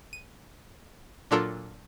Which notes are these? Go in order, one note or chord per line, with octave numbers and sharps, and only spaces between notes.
D#7
A#2 F#3 D4 F4 A4 A#4